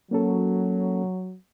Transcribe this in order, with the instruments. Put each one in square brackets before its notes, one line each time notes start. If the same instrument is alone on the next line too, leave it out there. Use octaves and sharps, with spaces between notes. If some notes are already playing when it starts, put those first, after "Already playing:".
[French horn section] F#3 [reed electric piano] A#3 C#4 A4